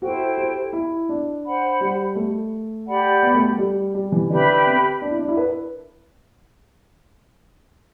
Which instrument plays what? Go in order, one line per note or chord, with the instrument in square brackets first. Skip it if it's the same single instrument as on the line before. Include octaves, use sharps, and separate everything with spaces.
[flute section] E4 A4 C5 G5 [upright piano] F#4
[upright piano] G4
E4
D4
[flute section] C5 F#5 B5
[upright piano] G3
A3
[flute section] G4 D5 F#5 B5
[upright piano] B3
A3
G3
G3
G3
E3
[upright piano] D3 [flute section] G4 B4 E5 B5
[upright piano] C4
D4
E4
D4
E4
B4